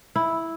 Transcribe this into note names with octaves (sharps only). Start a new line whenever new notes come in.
E4